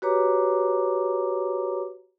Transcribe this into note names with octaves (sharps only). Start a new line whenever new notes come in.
F#4 G4 B4 C#5 A#5 D6